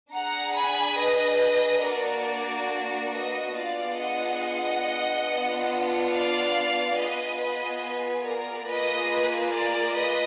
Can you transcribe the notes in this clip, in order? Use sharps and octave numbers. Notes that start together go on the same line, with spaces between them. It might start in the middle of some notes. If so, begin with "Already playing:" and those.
D4 G#4 F#5 A#5
G#5 B5
B4 D#5
A#3 D4 F#4 A#4 D5
A#4 D5
B4 D#5
B3 D4 F4 G#4 D5 F5
D#5 F#5
B3 D4 F4
D5 F5
B3 F4 G#4 B4 D#5
B4 D#5
B4
A#4 D5
A#3 F4 G#4 B4 D#5
B4
A#4 D5
B4 D#5